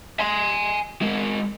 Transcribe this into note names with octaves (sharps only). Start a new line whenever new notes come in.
G#5 C6
G#3 A#4